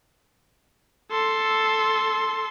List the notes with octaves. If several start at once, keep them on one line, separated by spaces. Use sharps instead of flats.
A4 C6